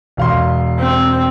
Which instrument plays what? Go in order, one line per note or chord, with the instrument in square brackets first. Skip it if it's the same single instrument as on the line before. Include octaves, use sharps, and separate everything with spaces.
[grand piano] E1 F5 C6
[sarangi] C4